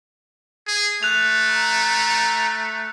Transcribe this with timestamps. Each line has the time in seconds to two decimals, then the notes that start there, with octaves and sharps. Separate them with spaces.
0.68 G#4
1.03 A3 F#6 F7
1.50 A#5